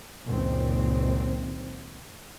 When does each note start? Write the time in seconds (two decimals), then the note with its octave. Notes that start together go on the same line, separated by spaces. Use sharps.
0.25 F#1 C#2 A#2 D#3 C4